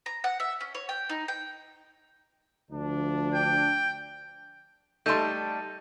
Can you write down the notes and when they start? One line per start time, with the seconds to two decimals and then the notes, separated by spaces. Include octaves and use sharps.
0.06 A#5
0.24 F#5
0.40 E5
0.61 C#4
0.75 C#5
0.89 G5
1.09 D#4
1.28 G5
2.71 D2 F3 D4
3.34 G5
5.06 G3 A3 D#4 A4 C6 G6 D#7